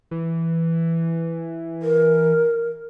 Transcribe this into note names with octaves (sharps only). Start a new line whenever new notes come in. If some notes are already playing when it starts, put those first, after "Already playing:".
E3
A#4